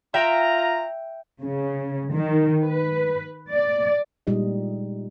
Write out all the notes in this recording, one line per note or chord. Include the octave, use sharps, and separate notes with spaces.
F4 E5 G5 A#5
C#3
D#3
B4
D5
A#2 G3 G#3 D#4 D#5